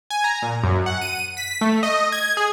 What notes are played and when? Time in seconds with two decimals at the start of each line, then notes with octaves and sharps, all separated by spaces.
0.10 G#5
0.24 A#5
0.42 A#2
0.64 F#2
0.86 F#5
1.01 D#7
1.37 B6
1.61 A3
1.83 D#5
2.12 G#6
2.37 G#4